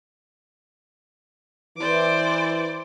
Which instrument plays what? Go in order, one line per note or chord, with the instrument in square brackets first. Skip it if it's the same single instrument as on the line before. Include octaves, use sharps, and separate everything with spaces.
[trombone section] E3 [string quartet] C5 D5 D6